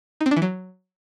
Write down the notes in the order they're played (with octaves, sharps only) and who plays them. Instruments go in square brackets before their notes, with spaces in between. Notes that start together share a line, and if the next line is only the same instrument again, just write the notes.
[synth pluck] D#4
C4
D4
E3
F#3